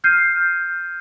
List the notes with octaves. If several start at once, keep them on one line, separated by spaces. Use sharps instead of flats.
F6 G6 C7 D#7